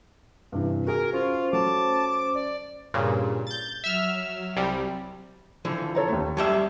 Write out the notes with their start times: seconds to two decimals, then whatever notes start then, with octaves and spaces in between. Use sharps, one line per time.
0.52 G2 C3 E3
0.87 F#4 G#4 A#4 G#5
1.13 C#4 F4 C5
1.53 F#3 A3 A5 D6
2.35 D5
2.94 G2 A#2 C#3
3.47 G6 A6
3.84 F#3 E5 E6 F6
4.56 C2 C3 G3
5.65 D3 E3 F3
5.95 A4 C#5 A#5
6.08 D#2 A3
6.37 F#3 G3 E5 A5